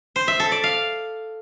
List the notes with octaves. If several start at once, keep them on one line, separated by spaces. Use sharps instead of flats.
C5
E5
A4
D5
F5